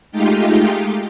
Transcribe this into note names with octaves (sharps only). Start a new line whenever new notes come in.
G#3 A3 D#4 F4 G4